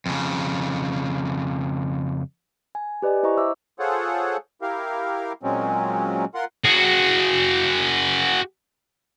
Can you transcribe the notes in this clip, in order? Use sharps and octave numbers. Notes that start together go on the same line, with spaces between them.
F2 C#3
G#5
G4 B4 D5 D#5 G#5
E4 C5 D#5 A#5 C#6
C5 E5 D6 E6
F4 G#4 A4 C5 C#5 F#5
E4 G4 A#4 F5
A#2 F#3 G#3 C4 C#4
F4 A#4 F#5 C6
F#4 G#4